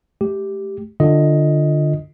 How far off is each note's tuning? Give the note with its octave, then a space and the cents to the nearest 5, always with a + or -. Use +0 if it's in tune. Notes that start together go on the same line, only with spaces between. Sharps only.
A3 -35 G4 +0
D3 +15 F4 +0 D#5 +10